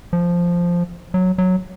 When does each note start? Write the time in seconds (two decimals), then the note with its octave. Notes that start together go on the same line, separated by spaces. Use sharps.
0.13 F3
1.14 F#3
1.38 F#3